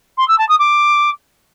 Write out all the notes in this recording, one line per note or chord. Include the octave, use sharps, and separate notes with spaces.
C6
E6
A5
D#6
D6